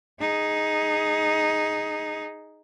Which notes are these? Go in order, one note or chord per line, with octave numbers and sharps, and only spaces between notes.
D#4 G#4